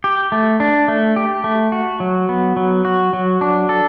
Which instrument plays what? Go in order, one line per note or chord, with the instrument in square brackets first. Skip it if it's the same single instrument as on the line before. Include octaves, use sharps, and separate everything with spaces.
[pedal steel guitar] G4
A3
D4
A3
G4
A3
F#4
F#3
B3
F#3
F#4
F#3
D4
A4